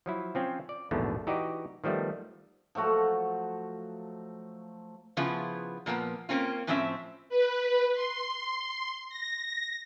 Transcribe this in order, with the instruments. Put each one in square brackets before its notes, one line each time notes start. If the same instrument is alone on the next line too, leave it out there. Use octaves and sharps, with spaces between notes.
[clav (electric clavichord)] F3 F#3 E4
F3 C4 C#4 F4
D5
A#1 E2 G#2 B2 D3 A3
E3 D#4 F#4 G4 D5 D#5
D#3 F3 G3 A3 B3
[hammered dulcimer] F3 F#3 A3 F#4
[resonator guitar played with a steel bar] C#3 F3 B3 E4 F4 G#4
A#2 F3 A#3 B3
A#3 C4 C#4 F4
A2 F3 C4 C#4 A#4 E5
[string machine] B4
C6
A#6